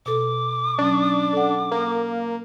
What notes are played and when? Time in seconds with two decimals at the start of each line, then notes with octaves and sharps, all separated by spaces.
0.06 B2 A4 D6
0.78 F#3 C#4 D4
1.33 A4 F#5
1.71 A#3